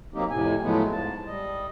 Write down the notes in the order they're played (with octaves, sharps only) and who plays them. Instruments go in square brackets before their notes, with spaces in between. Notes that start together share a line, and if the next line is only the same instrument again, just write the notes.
[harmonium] F#3 A#3 C4 D#4 G4
F2 A2 C3 G#5
A2 F3 F#3 G#3 A3 B3
G#2 A5
G3 D#5